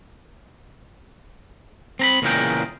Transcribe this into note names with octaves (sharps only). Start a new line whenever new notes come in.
C4 A#5 B5
E2 A#2 C#3 G#3 A#4 G5